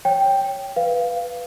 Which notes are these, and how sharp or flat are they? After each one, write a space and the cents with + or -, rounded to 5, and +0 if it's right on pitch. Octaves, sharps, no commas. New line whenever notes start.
C#5 +0 G5 +0
B4 +0 F5 -5